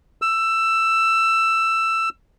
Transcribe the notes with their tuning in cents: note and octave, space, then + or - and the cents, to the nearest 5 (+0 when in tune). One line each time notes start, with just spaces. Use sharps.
E6 +15